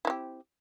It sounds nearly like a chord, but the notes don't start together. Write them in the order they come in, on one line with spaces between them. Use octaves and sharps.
E4 C4 G4